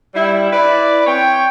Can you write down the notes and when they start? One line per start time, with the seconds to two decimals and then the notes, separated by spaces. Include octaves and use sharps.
0.14 G3 E4
0.52 E4 B4 D5
1.07 C4 C#5 G5